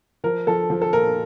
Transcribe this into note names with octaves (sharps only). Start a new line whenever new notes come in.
F3 A#4
F3 A4
F3
A4
A#2 A#4